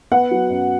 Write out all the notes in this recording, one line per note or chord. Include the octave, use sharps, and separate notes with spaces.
B3 F#5
F#3
F#2